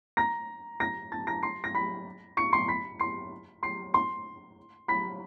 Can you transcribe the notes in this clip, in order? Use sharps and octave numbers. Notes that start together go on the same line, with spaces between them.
A#5 A#6
A#5 A#6
A5 A6
A#5 A#6
C6 C7
A#6
B5 B6
C#6 C#7
C6 C7
B5 B6
C6 C7
C6 C7
C6 C7
B5 B6